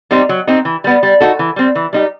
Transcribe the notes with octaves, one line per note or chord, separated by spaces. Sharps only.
G3 C4 D#4 G4
F#3
C4 D#4 G4
E3
G3 B3
G3
D#4 F#4 A4
E3
G3 C4
E3
G3 D#4 G4